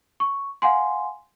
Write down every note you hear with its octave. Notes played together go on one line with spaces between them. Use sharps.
C#6
F5 F#5 G#5 C6